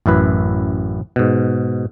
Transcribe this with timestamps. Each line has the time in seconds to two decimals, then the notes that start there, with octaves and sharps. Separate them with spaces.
0.06 A1 F#2 E4 B4
1.16 G#2 B2